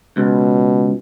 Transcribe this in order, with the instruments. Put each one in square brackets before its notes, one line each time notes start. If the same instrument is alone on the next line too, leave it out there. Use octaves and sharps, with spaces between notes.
[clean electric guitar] C#2 [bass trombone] B2